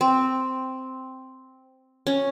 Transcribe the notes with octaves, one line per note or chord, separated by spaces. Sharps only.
C4
C#4